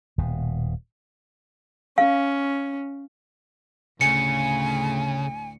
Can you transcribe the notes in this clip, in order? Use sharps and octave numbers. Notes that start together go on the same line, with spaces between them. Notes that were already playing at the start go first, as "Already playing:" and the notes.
D#1 B2
C#4 F5
D2 A2 C#3 G#5 C#7